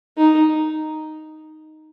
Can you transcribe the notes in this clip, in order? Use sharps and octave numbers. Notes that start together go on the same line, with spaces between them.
D#4